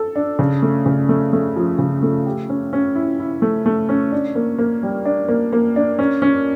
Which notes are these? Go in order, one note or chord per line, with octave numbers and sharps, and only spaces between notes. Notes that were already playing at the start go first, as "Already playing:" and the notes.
Already playing: A4
D4
C#3
A3
C#3
A3
A3
F3
C#3
A3
G4
C#4
C#4
E4
E4
A3
A3
C#4
D4
A#3
A#3
G3
D4
A#3
A#3
D4
C#4
C#4